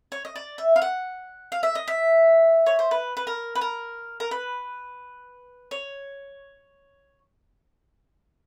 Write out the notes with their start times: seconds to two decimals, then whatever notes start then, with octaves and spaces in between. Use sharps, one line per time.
0.12 C#5
0.25 D#5
0.36 D5
0.58 E5
0.76 F5
0.82 F#5
1.52 F5
1.63 E5
1.75 D#5
1.88 E5
2.66 C#5
2.79 C5
2.91 B4
3.17 B4
3.27 A#4
3.55 B4
3.61 A#4
4.20 A#4
4.31 B4
5.71 C#5